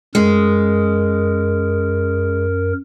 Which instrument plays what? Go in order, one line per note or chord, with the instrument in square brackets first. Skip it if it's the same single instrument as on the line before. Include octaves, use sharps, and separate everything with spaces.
[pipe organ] F#2 A#4 [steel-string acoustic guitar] G#3